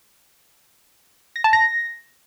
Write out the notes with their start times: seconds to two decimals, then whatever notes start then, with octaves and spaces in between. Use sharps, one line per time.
1.36 A#6
1.44 A5
1.53 A#6